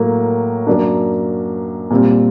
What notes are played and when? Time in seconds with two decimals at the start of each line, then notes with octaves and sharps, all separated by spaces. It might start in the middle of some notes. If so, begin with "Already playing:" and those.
Already playing: A2 F#3 A#3
0.67 F#2 F#3 A#3 D4
1.90 A#2 G3 C4